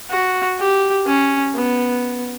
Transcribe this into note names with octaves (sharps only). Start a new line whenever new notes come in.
F#4
G4
C#4
B3